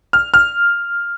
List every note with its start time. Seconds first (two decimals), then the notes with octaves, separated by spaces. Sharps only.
0.13 F6
0.34 F6